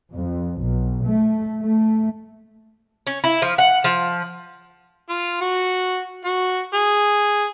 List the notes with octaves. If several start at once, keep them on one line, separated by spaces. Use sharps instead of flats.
F2
B1
A3
A3
C#4
E4
F3
F#5
F3
F4
F#4
F#4
G#4